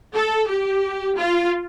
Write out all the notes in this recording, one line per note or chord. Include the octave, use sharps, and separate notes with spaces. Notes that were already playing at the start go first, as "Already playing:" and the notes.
A4
G4
F4